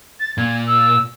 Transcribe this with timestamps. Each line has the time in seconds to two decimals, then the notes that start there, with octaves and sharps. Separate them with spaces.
0.20 A6
0.38 A#2 G#6
0.67 E6